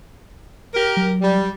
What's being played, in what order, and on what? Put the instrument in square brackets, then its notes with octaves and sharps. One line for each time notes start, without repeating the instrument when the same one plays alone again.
[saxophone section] G4 A#4
[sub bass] F#3
[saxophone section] G3